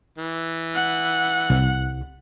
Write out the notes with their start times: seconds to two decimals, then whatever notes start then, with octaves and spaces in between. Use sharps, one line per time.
0.18 E3
0.74 F#5
1.50 C2